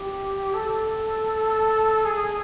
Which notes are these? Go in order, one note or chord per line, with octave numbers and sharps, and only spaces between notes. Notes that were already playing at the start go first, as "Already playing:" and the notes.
Already playing: G4
A4
G#4